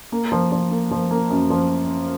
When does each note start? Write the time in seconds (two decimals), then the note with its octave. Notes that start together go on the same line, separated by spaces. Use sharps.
0.12 A#3
0.32 F3
0.52 F3
0.71 A#3
0.91 F3
1.11 A#3
1.30 F#2
1.50 F3